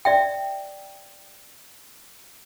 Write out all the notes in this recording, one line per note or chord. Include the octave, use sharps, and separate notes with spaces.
D5 E5 G5